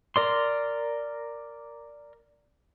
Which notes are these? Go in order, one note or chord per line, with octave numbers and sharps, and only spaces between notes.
A#4 D5 C6